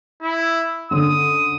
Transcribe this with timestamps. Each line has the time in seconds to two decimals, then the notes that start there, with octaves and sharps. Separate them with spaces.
0.22 E4
0.91 D3 C#4 D#6